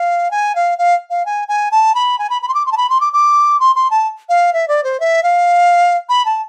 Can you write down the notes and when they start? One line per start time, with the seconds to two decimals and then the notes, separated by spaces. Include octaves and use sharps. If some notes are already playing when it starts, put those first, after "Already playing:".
Already playing: F5
0.31 G#5
0.55 F5
0.78 F5
1.10 F5
1.26 G#5
1.48 G#5
1.72 A5
1.95 B5
2.19 G#5
2.30 B5
2.42 B5
2.48 C6
2.54 D6
2.66 C6
2.72 A5
2.77 B5
2.90 C6
3.01 D6
3.13 D6
3.60 C6
3.75 C6
3.91 A5
4.29 F5
4.53 E5
4.68 D5
4.84 C5
5.00 E5
5.23 F5
6.09 B5
6.25 A5